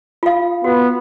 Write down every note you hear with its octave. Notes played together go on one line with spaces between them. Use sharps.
F4 F5
B3 F#4